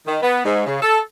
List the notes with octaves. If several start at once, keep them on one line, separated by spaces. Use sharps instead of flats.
D#3
B3
G#2
C#3
A4